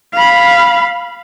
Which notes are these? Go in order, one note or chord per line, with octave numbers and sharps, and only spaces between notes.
F5 B5